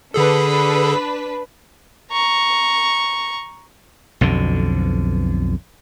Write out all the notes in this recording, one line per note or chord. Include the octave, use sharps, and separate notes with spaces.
D3 D4 G#4 A4 B4
A#5 C#6
B1 F2 D3